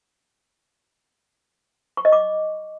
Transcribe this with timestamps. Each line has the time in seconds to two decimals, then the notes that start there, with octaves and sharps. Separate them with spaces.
1.97 C#6
2.05 D#5
2.12 D6